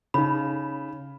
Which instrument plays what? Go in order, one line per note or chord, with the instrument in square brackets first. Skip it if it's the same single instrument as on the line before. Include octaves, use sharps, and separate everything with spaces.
[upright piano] C#3 [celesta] D#4 B5